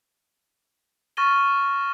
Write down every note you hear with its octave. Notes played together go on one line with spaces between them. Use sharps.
C#6 F6 A6 A#6 D#7 G7